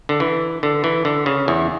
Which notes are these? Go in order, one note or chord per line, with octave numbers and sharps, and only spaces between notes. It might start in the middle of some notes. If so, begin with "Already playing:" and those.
D3
E3
D3
E3
D3
C#3
E2